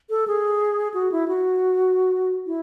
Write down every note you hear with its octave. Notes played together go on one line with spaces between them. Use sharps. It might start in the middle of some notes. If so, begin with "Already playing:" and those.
A4
G#4
F#4
E4
F#4
E4